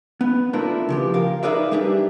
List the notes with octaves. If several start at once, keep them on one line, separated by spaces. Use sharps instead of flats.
B3
A3 D4 E4 F4 A#4 B4
C#3 F3 G4
A#4 F5
D#4 G#4 A#4 B4 D5 E5
G3 D4 G4 G#4 E5